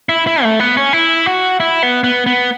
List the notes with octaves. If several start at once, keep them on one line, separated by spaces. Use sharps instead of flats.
E4
E4
A3
B3
C#4
E4
F#4
E4
B3
B3
B3